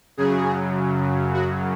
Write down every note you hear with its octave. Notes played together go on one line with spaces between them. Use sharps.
F#2 C#3 F#3 G#4
F#4